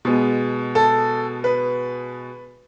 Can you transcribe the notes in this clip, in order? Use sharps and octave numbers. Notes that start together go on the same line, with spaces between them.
B2 G#3 B3
A4
B4